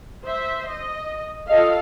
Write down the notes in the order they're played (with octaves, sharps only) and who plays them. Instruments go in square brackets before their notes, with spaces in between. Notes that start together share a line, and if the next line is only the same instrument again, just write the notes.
[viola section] C5 E5
D#5
[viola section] F4 A4 F5 [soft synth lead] D#5